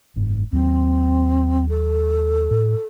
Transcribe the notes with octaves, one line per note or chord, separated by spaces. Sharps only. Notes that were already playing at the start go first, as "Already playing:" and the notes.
F#1 G#2
D#2 F#3 C4
A4
A2